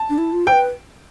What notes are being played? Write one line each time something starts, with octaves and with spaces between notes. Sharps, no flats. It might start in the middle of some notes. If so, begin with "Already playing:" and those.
Already playing: A5
D4
E4
F4
C5 G5
B4